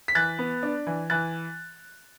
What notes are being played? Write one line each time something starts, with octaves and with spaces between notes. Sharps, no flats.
B6
E3 F#6 A6
B3
D4
E3
E3 F#6 A6